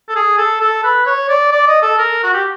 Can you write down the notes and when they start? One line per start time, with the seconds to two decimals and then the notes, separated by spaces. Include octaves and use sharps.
0.09 A4
0.16 G#4
0.38 A4
0.61 A4
0.84 B4
1.06 C#5
1.29 D5
1.52 D5
1.67 D#5
1.82 A4
1.98 A#4
2.23 F#4
2.33 G4